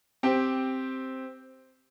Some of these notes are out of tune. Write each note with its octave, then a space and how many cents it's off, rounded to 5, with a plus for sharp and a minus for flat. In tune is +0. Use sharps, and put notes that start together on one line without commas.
C4 +0 G4 +0